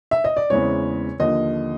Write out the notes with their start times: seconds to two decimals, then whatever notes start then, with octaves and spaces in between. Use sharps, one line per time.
0.11 E5
0.24 D#5
0.37 D5
0.50 E2 C#3 E3 G#3 C4 C#5
1.19 D#2 D3 F3 D#5